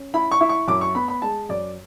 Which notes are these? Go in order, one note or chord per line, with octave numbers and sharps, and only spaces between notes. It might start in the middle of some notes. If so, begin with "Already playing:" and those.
Already playing: C#4
E4 B5
C#6
E4
C#6
F#2 D6
C#6
B3 B5
B5
G#3 A5
F#2 D5